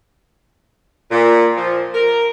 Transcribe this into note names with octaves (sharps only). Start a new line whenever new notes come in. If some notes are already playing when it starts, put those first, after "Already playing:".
A#2
F3
A#4